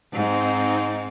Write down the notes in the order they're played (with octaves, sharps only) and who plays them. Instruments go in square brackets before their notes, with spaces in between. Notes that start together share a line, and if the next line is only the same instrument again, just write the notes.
[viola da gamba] G#2 [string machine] C4 D#4